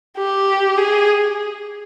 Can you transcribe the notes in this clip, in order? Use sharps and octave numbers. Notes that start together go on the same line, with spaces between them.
G4
G#4